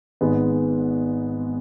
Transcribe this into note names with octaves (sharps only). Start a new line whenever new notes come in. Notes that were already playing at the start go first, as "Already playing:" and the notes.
G#1 G#2 G#3 B3